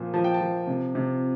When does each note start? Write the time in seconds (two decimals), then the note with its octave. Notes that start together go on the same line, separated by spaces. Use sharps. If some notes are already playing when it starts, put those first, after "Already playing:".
Already playing: A#2 F3
0.14 F3 A5
0.24 G5
0.34 A5
0.41 F3
0.67 C3
0.95 C3